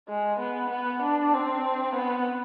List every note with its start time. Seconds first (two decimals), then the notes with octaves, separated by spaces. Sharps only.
0.08 G#3
0.39 B3
0.70 B3
1.02 D4
1.33 C4
1.96 B3